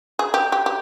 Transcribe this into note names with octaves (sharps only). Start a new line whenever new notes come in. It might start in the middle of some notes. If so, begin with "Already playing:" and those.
G#4
G4
G4
G4